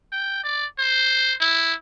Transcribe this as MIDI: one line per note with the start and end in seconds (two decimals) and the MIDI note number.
0.12 0.41 79
0.44 0.66 74
0.79 1.34 72
1.40 1.73 64